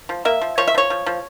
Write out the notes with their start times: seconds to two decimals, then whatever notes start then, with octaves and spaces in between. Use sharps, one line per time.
0.09 F3
0.25 A#3 E5
0.41 F3
0.58 F3 C#5
0.68 E5
0.75 F3 C#5
0.90 F3
1.06 F3